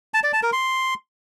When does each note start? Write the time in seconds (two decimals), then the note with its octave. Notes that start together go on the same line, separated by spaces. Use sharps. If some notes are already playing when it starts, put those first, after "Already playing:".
0.14 A5
0.24 D5
0.33 A5
0.43 A#4
0.53 C6